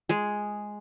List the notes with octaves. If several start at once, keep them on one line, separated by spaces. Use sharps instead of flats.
G#3 G#4